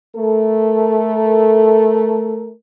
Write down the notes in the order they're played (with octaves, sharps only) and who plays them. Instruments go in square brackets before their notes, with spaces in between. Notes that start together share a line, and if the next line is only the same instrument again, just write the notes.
[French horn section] A3 A4 A#4